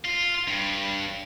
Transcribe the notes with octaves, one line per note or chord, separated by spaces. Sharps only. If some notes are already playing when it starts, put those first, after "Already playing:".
F4
G2